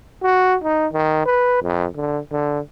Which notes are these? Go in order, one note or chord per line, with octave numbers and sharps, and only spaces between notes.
F#4
D#4
D#3
B4
F2
D3
D3